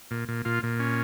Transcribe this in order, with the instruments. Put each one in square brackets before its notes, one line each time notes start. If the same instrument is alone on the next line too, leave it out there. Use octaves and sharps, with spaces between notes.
[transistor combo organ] A#2
A#2
A#2 F4
A#2
C#4